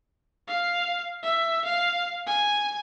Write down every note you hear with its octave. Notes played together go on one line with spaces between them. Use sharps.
F5
E5
F5
G#5